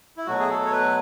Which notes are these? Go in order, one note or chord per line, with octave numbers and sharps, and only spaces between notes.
E4
B2 F#3 A3 F#4
G#4
A4
C#5
B4